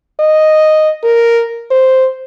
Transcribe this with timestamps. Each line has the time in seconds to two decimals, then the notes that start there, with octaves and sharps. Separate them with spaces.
0.20 D#5
1.04 A#4
1.71 C5